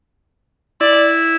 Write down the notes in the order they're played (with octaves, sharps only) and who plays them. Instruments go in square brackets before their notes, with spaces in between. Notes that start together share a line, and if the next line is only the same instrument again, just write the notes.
[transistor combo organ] E4 [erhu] D5